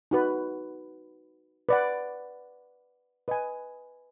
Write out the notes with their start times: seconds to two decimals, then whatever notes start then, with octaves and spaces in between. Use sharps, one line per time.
0.11 D#4 F#4 B4
1.69 B4 D5 F#5
3.28 B4 D#5 G#5